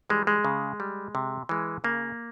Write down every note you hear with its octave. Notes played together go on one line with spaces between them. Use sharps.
E3 G3 G#3
G#3
C#3
G3
C3
E3 G#3
C#3 A#3